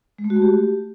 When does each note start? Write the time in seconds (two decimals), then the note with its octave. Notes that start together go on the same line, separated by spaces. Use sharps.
0.18 G#3
0.24 A3
0.30 F#4
0.36 A3
0.42 G4